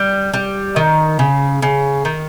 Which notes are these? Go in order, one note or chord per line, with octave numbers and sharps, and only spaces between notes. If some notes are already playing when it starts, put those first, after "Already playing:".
Already playing: G3
G3
D#3
C#3
C#3
D#3